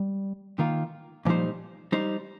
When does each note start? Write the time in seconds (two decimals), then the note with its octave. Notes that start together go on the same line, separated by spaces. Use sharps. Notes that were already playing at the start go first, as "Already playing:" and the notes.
Already playing: G3
0.59 D#3 A#3 F4 A#4
1.25 A#2 F3 G3 D#4 C5
1.92 G3 D#4 C5